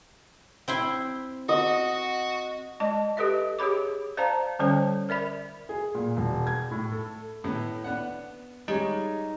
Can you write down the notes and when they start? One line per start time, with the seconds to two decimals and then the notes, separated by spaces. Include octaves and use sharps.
0.68 C4 E4 C6
1.49 F#4 D#5
2.80 G#3 D#5 A5
3.17 G4 A4 B4 D#5 E5
3.59 G4 G#4 C#5 B5 D6
4.17 C5 D5 F5 A5 A#5
4.59 D3 G3 C#4 C5 C#5
5.09 A#4 D5 E5 B5
5.69 G#4
5.95 A#2
6.17 E1
6.47 G#6
6.71 A2
6.92 A4
7.44 A2 B3
7.84 B3 D4 F#5
8.68 G3 G#3 D#4 C#5